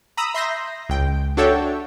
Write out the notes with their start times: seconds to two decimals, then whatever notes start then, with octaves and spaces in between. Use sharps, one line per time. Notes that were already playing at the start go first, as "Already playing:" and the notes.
0.17 A#5 B5 D#6 E6
0.34 E5 C6 G6 A#6
0.89 C#2 G5
1.37 D4 F#4 A4 C#5 E5 G5